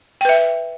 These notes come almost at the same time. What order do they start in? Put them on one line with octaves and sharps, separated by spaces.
G5 B4 E5